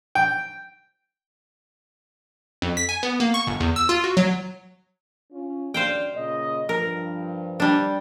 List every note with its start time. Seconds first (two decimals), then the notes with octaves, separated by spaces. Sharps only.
0.15 G5
2.62 F2
2.77 B6
2.89 G#5
3.03 B3
3.20 A#3
3.34 C#6
3.47 G1
3.60 E2
3.76 E6
3.89 F4
4.04 F#4
4.17 F#3
5.32 C#4 F4
5.74 F#2 D4 C5 D5 F5 G5
6.14 A#2 C#3 D#5
6.69 G2 F3 A#4
7.60 G3 D4